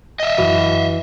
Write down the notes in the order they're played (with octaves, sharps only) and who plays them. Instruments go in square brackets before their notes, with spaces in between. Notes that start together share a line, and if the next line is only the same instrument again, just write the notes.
[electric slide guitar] D#5 E5
[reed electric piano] F#2 F#4 [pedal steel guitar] E3